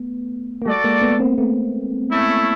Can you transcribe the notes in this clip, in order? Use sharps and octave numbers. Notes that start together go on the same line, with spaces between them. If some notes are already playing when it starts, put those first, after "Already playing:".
Already playing: A3 B3
A#3
G3 A3 F#4 A4 D5
G#3 A#3
A3 B3
A#3 C4
A3 B3
A3 C#4 E4